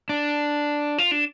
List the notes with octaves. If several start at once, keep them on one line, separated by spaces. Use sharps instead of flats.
D4
F4
D4